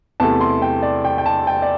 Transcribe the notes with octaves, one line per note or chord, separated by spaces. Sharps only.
E2 C3 A3 E4 A5
C6
G5
D5
G5
G5
A5
G5
D5